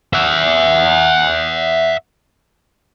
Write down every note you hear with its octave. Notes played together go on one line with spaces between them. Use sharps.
E5 F#5